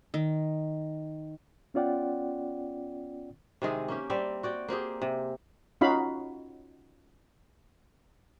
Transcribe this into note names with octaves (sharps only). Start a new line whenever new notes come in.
D#3
B3 C#4 F4 D5 F#5 G5
C3 D#3 G#3 G#4
A#3 C#4 G4
G3 C4 D5 E5
F#4 D5 G5
A#3 C4 G4 G#4
C3
C#4 D#4 F4 F#4 F5 B5